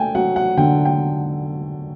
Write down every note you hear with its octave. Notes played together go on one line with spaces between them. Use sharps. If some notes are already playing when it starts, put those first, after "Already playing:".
Already playing: A3 G5 G#5
F#3 F#5
F#5
D3 G5
G5